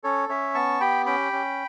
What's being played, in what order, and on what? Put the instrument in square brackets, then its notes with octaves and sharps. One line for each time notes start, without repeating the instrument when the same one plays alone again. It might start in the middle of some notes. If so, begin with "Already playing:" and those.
[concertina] C#4 A4 C#5
C#4 C#5 E5
B3 A5 C#6
G4 G5 B5
C#4 G5 B5
C#4